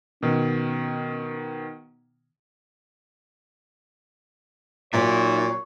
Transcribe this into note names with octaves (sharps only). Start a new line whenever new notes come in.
B2 D#3 C#4
A#2 F#3 C#4 D#4 F4 C#5 E5